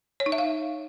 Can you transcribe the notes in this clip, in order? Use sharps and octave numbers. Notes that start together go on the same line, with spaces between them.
C#5
D#4
E5
F5